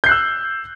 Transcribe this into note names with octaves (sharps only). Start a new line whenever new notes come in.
E6 F#6 G6 C7